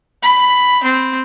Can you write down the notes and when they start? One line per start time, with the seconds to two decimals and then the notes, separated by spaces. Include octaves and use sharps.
0.23 B5
0.84 C4